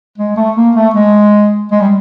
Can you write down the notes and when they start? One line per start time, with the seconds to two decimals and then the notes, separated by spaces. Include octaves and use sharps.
0.18 G#3
0.37 A3
0.56 A#3
0.75 A3
0.94 G#3
1.72 G#3
1.80 G3